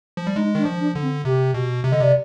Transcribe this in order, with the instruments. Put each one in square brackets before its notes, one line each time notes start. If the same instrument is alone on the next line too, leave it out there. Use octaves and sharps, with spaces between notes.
[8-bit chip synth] F3
G3
[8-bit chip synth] G#3 [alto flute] D#4
[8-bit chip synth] D#3 [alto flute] D4
[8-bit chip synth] F3
[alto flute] D4
[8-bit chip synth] D3
[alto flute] C4
[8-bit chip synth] C3 [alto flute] G4
[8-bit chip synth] B2
C3
[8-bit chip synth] D3 [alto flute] D#5
[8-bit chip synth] C3 [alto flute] D5